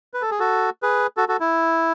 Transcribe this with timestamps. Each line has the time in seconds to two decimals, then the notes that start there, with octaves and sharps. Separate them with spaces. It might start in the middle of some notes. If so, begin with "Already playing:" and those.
0.14 B4
0.22 A4
0.31 G#4
0.39 F#4 A4
0.83 G#4 B4
1.17 F#4 A4
1.28 F#4 A4
1.40 E4